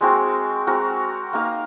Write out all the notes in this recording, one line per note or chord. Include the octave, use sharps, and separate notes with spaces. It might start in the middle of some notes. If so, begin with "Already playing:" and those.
G#3 C4 F#4 A#4
G#3 C4 F#4 A#4
A#3 D#4 A#4 F5